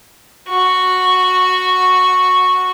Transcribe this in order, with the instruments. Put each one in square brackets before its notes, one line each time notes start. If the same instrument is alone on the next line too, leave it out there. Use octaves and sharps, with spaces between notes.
[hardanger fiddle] F#4 C#6